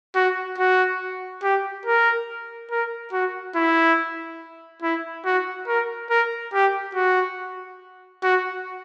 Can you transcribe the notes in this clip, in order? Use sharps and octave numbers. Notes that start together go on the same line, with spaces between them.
F#4
F#4
G4
A#4
A#4
F#4
E4
E4
F#4
A#4
A#4
G4
F#4
F#4